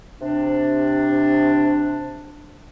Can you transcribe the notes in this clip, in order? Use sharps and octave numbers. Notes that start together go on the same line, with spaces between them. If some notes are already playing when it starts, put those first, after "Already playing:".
C3 D4